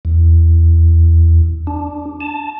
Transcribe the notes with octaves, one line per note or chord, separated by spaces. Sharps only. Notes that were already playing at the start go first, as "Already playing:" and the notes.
E2
D4
A5